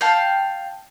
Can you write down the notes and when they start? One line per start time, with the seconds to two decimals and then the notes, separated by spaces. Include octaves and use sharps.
0.01 F5 G5 A5